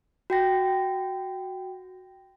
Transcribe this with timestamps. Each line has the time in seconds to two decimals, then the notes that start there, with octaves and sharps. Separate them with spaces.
0.30 F#4 G5 A#6